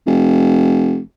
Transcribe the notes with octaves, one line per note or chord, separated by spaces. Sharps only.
F1